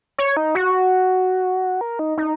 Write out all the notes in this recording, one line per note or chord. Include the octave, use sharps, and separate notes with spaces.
C#5
D#4
F#4
A#4
D#4
D#4